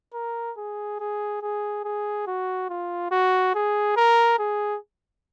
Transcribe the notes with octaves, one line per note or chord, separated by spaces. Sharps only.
A#4
G#4
G#4
G#4
G#4
F#4
F4
F#4
G#4
A#4
G#4